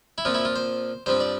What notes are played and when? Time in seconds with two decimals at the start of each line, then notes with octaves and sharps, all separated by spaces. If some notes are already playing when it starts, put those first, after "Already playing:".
0.18 E4
0.25 A#2 F3 C4 F4
0.35 E4
0.45 F4
0.56 C5
1.06 G2 F3 C4 C5
1.20 D5